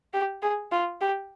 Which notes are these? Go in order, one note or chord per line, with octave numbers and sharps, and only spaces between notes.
G4
G#4
F4
G4